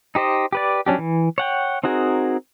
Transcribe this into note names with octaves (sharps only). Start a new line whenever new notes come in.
D#4 G4 C5 D#5
G4 B4 D5
F#3 C#4 D4 G4
E3
C#5 F#5 G5
C4 D#4 F#4 G#4 A#4